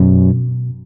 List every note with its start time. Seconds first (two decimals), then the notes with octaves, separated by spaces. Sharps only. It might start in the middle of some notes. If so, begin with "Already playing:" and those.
Already playing: F#2 B2